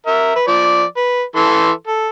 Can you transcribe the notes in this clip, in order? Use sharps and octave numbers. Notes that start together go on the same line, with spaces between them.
A#4 E5
B4
F3 D5
B4
E3 A4 C6
A4